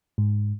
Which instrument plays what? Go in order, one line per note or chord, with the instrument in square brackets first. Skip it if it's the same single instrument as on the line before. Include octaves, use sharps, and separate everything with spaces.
[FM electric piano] G#2